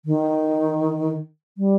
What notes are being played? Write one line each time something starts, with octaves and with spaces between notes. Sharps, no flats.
D#3
G3